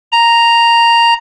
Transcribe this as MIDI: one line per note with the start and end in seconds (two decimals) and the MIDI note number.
0.12 1.14 82